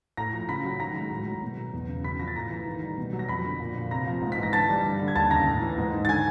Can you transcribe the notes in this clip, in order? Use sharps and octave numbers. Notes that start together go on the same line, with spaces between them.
A2 A#5 A#6
F3
C#3 B5 B6
F#3
D#3 A#5 A#6
G#3
A2
F#3
B2
F#3
E2
C#3
C#3 B5 B6
F3 A#6
A6
A2 A#5 A#6
E3
D#3
G3
B2
F#3
A#6
F2 B5 B6
D3
A#2
F3
C3 A#5 A#6
F3
G#2
B6
E3
A#6
D3 A5 A6
G3
G2
D3
G#6
D#2 A5 A6
C#3 A#5 A#6
A2
E3
G#2
D#3
A6
D3 G#5 G#6